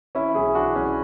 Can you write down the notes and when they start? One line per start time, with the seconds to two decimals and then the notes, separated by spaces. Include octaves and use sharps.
0.15 E3 C#4 E4
0.35 B1 E4 G#4
0.55 E3 D4 F#4
0.75 B1 C#4 E4